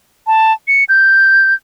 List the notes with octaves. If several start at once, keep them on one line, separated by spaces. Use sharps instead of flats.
A5
C#7
G6